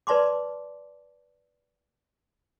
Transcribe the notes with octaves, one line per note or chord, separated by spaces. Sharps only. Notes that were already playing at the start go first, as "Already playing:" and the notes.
B4 D5 A5 C6 D6